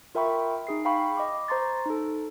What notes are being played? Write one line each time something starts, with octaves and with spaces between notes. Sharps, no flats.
F4 A#4 E5 G5 B5 C#6
D#4 G#4 C7
F5 G5 B5 C#6
D#5 D6
C5 A#5 C6 C#6 A6
D#4 A4